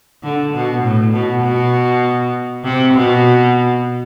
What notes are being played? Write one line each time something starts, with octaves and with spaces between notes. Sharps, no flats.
D3
B2
A2
B2
B2
C3
B2